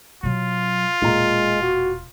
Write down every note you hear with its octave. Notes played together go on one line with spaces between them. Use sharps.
B2 F#3 F4
E1 A#2 G#3 A#5
F#4